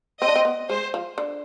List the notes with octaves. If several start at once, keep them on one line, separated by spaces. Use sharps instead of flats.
C4 D#5
D4
C4
B3
G#3 C5
F3
D3